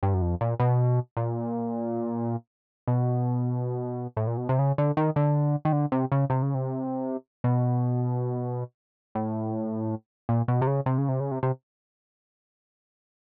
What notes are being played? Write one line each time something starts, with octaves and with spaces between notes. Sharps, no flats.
G2
F#2
F2
A#2
B2
A#2
B2
A2
A#2
B2
C3
C#3
D3
D#3
D3
D#3
D3
C3
C#3
C3
C#3
C3
B2
A2
A#2
B2
C3
C#3
C3
C#3
C3
C#3
C3
C3